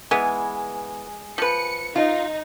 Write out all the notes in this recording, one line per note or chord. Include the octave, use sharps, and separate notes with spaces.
E3 G#3 B3 G#5
F3 B4 C#7
D#4 F4